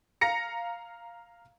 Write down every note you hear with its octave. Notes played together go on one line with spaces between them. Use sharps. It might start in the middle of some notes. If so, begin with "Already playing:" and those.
F5 A#5 A#6 C#7